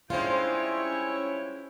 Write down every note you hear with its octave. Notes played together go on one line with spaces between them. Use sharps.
G2 G#3 C#4 E4 F4 C5 C#5 G5